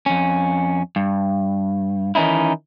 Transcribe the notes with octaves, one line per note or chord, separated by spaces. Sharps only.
F2 C#4
G2
D#3 E3 C#4 D#4 E4